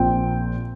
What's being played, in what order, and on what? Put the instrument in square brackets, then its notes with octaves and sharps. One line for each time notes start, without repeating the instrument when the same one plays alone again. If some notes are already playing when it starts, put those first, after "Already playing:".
Already playing: [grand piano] A#1 A#2 F3 C4 G5